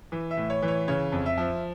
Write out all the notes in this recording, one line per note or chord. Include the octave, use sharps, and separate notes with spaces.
E3
E5
A2
C#5
E3
C#5
C#3 C#5
F2
E5
F3